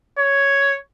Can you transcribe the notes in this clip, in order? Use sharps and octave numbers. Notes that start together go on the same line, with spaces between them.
C#5